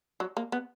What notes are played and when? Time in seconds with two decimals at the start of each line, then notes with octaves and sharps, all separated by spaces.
0.20 F#3
0.37 A#3
0.52 B3